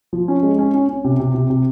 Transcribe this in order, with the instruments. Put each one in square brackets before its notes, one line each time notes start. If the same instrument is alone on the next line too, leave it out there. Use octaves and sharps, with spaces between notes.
[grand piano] F3
C#4
G#3
C#4
C#4
C#4
C3
C3
C3
C3